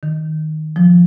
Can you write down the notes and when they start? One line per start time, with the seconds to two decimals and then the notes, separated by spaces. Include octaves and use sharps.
0.03 D#3
0.76 F3